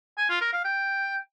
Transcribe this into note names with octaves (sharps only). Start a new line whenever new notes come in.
G#5
F4
A#4
F5
G5